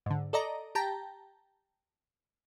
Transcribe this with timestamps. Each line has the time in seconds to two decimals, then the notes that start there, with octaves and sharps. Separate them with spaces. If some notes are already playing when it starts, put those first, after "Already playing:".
0.06 G#2 D3
0.33 A4 D5 D#5 A#5
0.75 G4 G5 A5 A#5